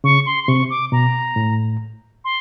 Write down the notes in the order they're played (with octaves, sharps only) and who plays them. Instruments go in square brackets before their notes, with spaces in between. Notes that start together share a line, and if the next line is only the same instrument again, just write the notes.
[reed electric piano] C#3 [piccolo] C#6
[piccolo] C6
C6
[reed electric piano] C3 [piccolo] C#6
[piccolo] D6
[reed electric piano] B2 [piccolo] A#5
[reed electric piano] A2
[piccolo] C6